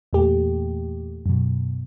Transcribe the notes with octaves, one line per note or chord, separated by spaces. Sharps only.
E2 A#2 A3 G4
F#2 B2